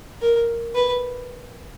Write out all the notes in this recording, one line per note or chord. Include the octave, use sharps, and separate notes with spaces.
A#4
B4